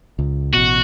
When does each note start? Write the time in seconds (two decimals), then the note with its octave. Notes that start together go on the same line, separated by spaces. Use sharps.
0.19 C#2
0.53 A1 B2 F#4